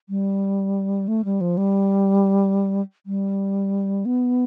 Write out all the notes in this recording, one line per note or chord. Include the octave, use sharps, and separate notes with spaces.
G3
A3
G3
F3
G3
G3
B3